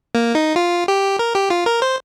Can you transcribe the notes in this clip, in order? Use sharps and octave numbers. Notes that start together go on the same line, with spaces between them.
A#3
D#4
F4
G4
A#4
G4
F4
A#4
C5